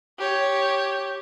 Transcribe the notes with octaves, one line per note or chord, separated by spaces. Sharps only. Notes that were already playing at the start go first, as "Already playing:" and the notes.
G4 C#5